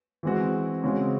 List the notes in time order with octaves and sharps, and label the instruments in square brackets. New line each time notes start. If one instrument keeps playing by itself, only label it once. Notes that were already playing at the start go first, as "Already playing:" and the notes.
[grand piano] E3 G#3 C4 F#4
C#3 G#3 C4 F#4